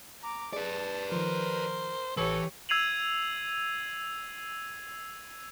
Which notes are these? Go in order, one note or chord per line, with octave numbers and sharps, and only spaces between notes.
A#5 D6
G#4 B4 D5 A5
D#3 F3 A#4 C5
A1 E3 G4 A4 B4 C#5
E6 G#6 C7 D#7 F7 F#7